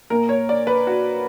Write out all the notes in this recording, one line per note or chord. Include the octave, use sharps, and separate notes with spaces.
A#2 A#3 A#4
C#5
D5
B4
F#4